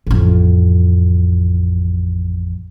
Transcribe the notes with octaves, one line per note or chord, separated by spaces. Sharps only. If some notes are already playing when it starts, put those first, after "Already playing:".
A1 F2